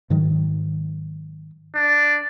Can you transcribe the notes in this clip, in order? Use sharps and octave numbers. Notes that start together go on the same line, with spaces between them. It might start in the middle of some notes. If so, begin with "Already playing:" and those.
G#2 D#3 F#3
D4